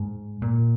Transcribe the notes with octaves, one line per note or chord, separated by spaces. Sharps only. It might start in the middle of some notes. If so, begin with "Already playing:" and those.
Already playing: G#2
A#2